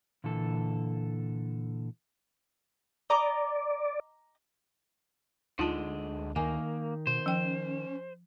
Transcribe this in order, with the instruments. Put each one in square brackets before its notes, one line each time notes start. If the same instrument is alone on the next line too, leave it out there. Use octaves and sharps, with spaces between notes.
[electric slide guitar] A#2 D3 E3 A4
[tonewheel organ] D5 [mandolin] D#5 A#5 D6
[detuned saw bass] D2 [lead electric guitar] D3 G#3 [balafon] D#4 F4 A5
[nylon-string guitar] D#3 G#5 [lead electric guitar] A#3
[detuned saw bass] B2 [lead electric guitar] C5
[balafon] F3 G5 [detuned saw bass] C#4